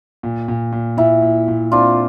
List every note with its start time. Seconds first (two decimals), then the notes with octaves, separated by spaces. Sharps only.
0.23 A#2
0.48 A#2
0.72 A#2
0.97 A#2 E4
1.22 A#2
1.48 A#2
1.72 C4 D4 F4